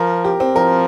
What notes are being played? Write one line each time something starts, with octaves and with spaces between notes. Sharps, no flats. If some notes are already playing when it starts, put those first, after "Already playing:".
Already playing: F3 A#4
G4
C4
F3 A#4